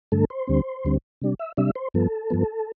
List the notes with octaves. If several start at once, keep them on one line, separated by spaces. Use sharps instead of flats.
G2 D3 A3 A4
C5
D2 D3 G3 C4
D2 D3 G3 C4
C3 G3 D4
E5
C3 G3 D4 E5
C5
G2 F3 B3 A4
G2 F3 B3